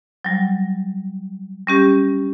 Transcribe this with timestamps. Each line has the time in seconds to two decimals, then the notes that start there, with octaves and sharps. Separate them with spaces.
0.24 F#3 G3
1.67 G3 C#4 G4